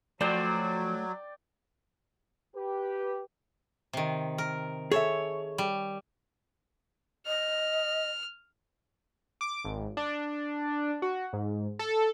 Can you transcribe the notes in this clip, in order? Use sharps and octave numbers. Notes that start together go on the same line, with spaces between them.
F3 F#3 A3 F#4 C5 D5 G5 A5
G4 B4
C3 D#3
A#4
G#4 A4 C#5 E5
G3
D#5 F6
D6
G#1
D4
F#4
G#2
A4